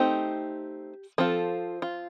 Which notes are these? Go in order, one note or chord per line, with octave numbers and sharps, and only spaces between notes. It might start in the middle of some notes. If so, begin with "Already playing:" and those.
Already playing: A3 C4 D#4 G4
F3 C4 F4 A4
F4